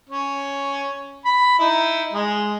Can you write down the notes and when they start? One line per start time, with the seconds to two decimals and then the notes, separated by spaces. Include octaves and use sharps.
0.10 C#4
1.25 B5
1.59 D#4 E4
2.13 G#3